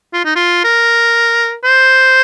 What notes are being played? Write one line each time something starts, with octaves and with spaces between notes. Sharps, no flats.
F4
D#4
F4
A#4
C5